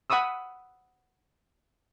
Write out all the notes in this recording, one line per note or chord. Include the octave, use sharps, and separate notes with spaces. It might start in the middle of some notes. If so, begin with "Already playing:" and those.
F#5 B5 C#6 D#6 E6